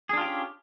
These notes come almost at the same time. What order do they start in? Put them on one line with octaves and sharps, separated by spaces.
G#4 D4 F4 G4 C#4